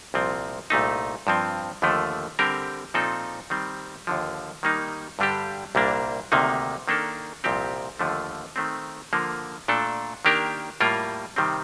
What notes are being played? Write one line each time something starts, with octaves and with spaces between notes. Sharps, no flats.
C2 A#2 F3 C4
C2 A#2 A3 D#4
G2 F3 C4
D#2 D3 F3 A3
D3 G3 C4 G4 A#4
A#2 F3 C4 D#4 A4
D#3 G3 C4
D#2 D3 F3
D#3 G3 A#3 D#4
G2 D3 G3 D4 G4
C2 A#2 G3 A#3 D4
D2 C3 D#3 A#3 D#4
D#3 A#3 D4 A4
C2 A#2 F3 C4 G4
D#2 D3 F3 A3
D#3 A3 C4
D3 F3 A#3
A#2 A3 D4 A4
D#3 A#3 D4 G4 A#4
A2 G3 A#3 F4 A#4
C3 D#3 G3 C4